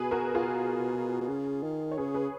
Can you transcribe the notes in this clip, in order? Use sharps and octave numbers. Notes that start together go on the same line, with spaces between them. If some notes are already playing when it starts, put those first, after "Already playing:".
Already playing: B2 G#4 B4
F#4 A#4
F4 G#4
B2
C#3
D#3
C#5
C#3 G#4 B4
G#4 B4